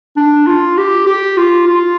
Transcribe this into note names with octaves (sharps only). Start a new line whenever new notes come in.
D4
F4
G4
G4
F4
F4